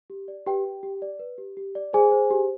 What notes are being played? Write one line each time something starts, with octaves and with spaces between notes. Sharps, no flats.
G4
D5
G4 B4 G5
G4
G4
D5
B4
G4
G4
D5
G#4 C5 G#5
C5
G4